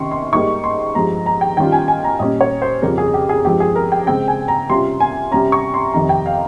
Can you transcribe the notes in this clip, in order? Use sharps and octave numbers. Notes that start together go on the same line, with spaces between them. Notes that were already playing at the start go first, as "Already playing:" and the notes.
Already playing: C3 D#3 C#4 C6 C#6
C6
G#2 G3 A#3 D#4 C#6
C6
G2 F3 G#3 A#5
A#5
G5
D#3 G3 C#4 F4 G5
G#5
G#5
A#5
A#2 G3 C#4 D#5
C#5
C5
F2 C#3 G3 C#4 F4 A#4
G#4
G4
G#4
G2 F3 G#3 C4 G4
G#4
A#4
G5
C#3 G#3 C4 G5
G#5
A#5
C3 G3 C#4 F4 C6
G#5
C3 G3 C#4 A#5
C#6
C6
F2 C3 D#3 A#5
G5
F5